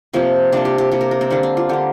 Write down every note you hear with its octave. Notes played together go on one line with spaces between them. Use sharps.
C3 F3 A#3 C4
C3 G3 A#3 D4
G4
G4
C3 A#3 G4
A#4
A#4
C4
D3 G3 A#3 D4
D4
F4
D3 A#3 G4